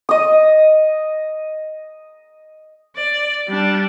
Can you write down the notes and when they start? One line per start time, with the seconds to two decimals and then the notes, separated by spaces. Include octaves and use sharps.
0.09 D#5 D#6
2.96 D5
3.48 G3 D4